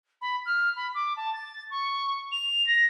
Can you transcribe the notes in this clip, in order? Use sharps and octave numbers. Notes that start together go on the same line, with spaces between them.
B5
F6
B5
D6
A5
A6
C#6
F7
A#6